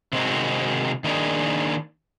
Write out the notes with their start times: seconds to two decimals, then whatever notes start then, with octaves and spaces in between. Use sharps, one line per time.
0.13 C3 D#3 G#3 C4 D#4 F#4
1.04 D#3 A#3 D4 D#4 G#4